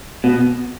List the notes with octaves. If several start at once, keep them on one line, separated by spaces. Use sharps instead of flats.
B2